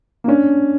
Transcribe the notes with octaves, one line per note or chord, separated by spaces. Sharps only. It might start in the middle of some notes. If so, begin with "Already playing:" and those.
A#3
C#4 D4